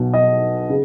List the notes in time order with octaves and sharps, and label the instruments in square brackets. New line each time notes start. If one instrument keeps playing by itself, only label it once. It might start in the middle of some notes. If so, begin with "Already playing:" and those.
Already playing: [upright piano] B1 B2 F#3
D#5
C#3